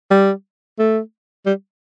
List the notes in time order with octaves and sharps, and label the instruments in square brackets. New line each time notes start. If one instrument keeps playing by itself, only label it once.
[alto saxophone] G3
A3
G3